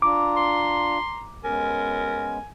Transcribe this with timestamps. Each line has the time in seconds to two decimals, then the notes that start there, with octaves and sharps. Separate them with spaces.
0.02 D4 F4 A#5 D6
0.37 C6
1.45 G#3 B3 C#4 A#4 G#5